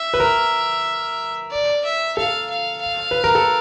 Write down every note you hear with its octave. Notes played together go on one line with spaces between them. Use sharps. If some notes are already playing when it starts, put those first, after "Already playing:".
Already playing: E5
B4
A#4
D5
E5
A4 F5
F5
F5
B4
A#4
A4